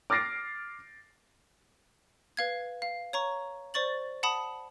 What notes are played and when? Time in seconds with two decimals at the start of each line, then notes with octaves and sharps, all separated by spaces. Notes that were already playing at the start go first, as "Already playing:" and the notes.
0.10 D6 F6 A6 A#6 C7 D7
2.37 B4 F5 G#6
2.82 F5
3.13 C#5 A#5 C#6
3.74 C5 D5 C#6 A6 F#7
4.23 F#5 A5 B5 D#6